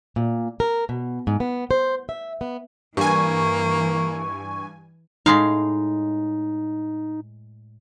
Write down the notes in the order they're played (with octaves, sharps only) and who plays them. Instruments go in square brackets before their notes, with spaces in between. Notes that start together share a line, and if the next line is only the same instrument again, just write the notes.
[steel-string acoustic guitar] A#2
A#4
B2
G#2
B3
C5
E5
B3
[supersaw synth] G2 G#5 [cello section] E3 [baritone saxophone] A#3 [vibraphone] C#6
[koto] A2 G#3 F5 [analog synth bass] D#4